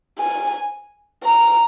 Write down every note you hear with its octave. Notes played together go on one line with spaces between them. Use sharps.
G#5
A#5